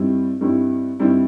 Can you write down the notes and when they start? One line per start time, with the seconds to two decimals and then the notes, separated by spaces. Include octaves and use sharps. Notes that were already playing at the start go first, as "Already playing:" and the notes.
Already playing: G2 D#3 G3 C4 E4
0.41 G2 D#3 G3 C4 E4
1.00 G2 D#3 G3 C4 E4